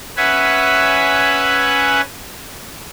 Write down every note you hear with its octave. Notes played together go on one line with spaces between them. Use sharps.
C#4 B4 E5 F#5 G#5 B5